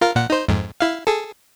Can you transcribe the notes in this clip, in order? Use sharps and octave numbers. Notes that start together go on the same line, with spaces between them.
F4 A#4 F5
A#2 F#5
D#4 C5
F2 G#2
E4 F5
G#4 A4